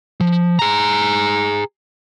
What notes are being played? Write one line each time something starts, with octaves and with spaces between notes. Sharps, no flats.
F3
G#4 A#5